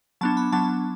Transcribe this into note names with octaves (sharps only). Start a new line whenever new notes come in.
F#3 B3 D4 A5
B5
F#3 B3 D4 A5